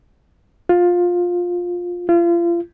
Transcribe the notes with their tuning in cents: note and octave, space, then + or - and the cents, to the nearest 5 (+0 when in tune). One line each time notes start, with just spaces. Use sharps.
F4 +15
F4 -35